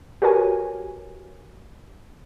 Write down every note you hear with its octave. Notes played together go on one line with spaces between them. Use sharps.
F#4 G4 A#4 B4 C#5 G#5